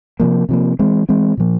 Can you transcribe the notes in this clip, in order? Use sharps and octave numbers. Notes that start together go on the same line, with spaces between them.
C3 F3 A#3
C3 F3 A#3
E3 G#3 C4
E3 G#3 C4
A#2 F3 A#3